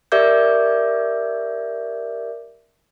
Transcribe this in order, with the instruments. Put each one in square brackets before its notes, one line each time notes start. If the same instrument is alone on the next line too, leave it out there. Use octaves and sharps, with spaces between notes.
[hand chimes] G4 A#4 D5 E5 D6 G6